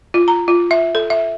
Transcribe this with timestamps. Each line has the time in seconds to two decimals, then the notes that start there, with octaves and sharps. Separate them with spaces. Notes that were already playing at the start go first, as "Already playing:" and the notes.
0.14 F4
0.28 A#5
0.48 F4
0.71 E5
0.95 A4
1.10 E5